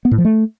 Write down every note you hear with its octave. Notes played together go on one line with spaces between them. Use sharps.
B3
A2
F3
A3